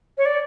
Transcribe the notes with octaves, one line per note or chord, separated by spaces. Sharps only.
C#5
D5